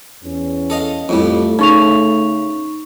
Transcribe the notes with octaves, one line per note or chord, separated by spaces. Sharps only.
E2 C#4
A4 D#5 F5
F2 A2 G3 A3
C#3 D#4 C#6 F7